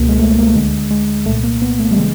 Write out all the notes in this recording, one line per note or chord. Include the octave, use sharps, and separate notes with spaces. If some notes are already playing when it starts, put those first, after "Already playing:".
Already playing: C#2 B2 A#3
G#3
A3
A#3
A3
D2 D3 G#3
G#3
C2 A#2 A3
A#3
B3
A3
G3
C#3 E3 G#3